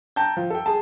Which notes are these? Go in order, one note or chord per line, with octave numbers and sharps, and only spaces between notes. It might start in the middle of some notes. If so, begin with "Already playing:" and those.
G5 A5 A#5 G6
F3
A4 G5
G#4 A5